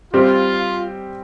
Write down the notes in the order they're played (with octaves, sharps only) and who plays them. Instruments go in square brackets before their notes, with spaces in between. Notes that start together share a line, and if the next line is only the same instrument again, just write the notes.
[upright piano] G3 C4 G4 [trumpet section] F4